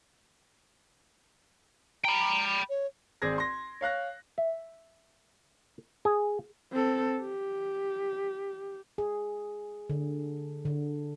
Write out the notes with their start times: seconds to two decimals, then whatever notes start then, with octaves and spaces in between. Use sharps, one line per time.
2.04 G5 A#5 B5
2.69 C#5
3.22 G#1 C4 G#4 D5 G#6 A#6
3.38 C6 A#6
3.81 C#5 F5 F#6 A#6
4.38 E5
6.05 G#4
6.72 C4 A4
7.21 G4
8.98 G#4
9.90 D3
10.65 D3